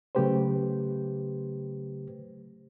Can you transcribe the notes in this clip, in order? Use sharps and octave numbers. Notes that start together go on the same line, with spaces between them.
C#3 F#3 A3 G4 B4 C5